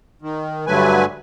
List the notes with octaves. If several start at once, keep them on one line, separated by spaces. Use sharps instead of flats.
D#3
G2 D3 F#3 A3 B4 G#5